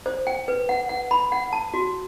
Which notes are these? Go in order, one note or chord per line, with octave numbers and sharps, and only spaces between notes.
C5
G5
B4
F#5
F#5
B5
F#5
A5
F#4